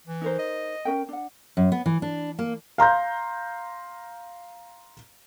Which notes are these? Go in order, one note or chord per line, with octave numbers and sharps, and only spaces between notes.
E3
D#4 A#4 C5
D#5
C#4 A#4 G5
D4 F#5
F#2
B3
E3
D4
A#3
F5 A#5 C6 G6